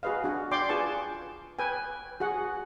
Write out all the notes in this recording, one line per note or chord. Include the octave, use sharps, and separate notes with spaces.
F#4 G#4 B4 D#5 F5
D4 F#4
D5 G5 C6 D6
F4 G#4 B4 G#5 A5 C#6
B4 G5 G#5
F#4 G#4 F#5